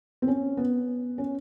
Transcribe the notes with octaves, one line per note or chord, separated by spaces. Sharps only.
C4
C#4
B3
C#4